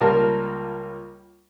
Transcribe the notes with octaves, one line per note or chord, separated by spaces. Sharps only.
C#2 G3 A#3 F4 A#4 A5